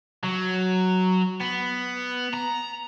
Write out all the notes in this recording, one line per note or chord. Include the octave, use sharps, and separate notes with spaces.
F#3
B3
A#5